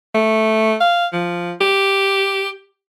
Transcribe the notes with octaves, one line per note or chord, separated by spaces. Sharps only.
A3
F5
F3
G4